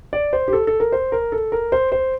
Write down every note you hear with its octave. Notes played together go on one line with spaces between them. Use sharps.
D5
C5
G4
A4
A4
A#4
C5
A#4
A4
A#4
C5
C5